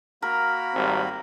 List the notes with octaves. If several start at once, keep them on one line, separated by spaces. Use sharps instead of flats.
A#3 F#4 A#4 B5
G#1 G3 C4